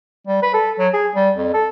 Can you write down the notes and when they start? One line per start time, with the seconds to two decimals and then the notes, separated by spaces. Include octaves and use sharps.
0.27 G3
0.42 B4
0.54 A4
0.79 F#3
0.93 G#4
1.15 G3
1.37 F2
1.54 A4